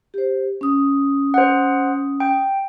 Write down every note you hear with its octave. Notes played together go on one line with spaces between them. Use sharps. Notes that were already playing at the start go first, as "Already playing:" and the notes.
G4 C5
C#4 D#6
C5 F#5
G5